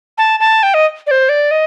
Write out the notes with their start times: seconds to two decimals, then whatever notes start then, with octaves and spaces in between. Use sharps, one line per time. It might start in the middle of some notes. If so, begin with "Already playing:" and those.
0.18 A5
0.40 A5
0.63 G5
0.74 D#5
1.07 D5
1.11 C5
1.29 D5
1.51 D#5